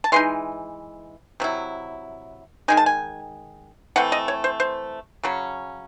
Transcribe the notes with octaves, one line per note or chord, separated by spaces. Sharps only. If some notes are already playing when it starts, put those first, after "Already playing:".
A5
E3 G#3 D#4 C6
C3 F#3 E4
D#3 G#3 D#4 G#5
A5
G#5
E3 A3 C4 F#5
D#5
C#5
C5
C5
C#3 F#3 C#4